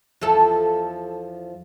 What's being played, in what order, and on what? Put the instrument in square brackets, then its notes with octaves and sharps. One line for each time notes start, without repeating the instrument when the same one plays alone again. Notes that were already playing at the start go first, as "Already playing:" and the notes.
[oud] E2 F3 A4